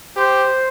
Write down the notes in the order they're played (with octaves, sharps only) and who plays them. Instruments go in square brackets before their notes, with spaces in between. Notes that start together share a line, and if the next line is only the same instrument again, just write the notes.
[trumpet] G4 [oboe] C5